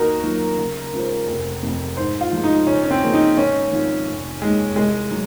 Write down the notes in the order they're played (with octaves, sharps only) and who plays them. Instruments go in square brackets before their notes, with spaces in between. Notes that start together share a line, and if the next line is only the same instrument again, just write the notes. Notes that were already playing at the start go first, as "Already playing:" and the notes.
Already playing: [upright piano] D#2 [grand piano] D#4 F#4 A#4
[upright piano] D#3 F#3 A#3 F4
C#3
G#3 C#4 F4 C5
F1
F2 C3
[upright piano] G#2 [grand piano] C5
[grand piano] F4
[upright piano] F3 G#3
[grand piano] D#4
[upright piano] C#3 [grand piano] C#4
[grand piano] C#4
C4
[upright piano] F3 A#3 C#4 G#4
[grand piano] D#4
[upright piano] G#1 [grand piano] C#4
[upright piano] G#2 F3 C4 D#4
F1
[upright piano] D#2 D#3 [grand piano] G#3
[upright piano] C2 [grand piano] G#3
[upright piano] F#3